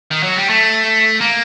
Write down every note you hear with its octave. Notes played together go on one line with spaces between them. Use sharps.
D#3
F#3
G3
A3
A#3